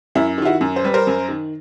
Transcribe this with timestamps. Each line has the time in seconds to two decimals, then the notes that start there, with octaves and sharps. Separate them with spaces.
0.15 F#2 E4
0.38 D#3 F4
0.45 E4 F#4
0.61 F#2
0.76 C5
0.84 G3 B4
0.94 A#4 C5
1.07 F#2
1.29 D#3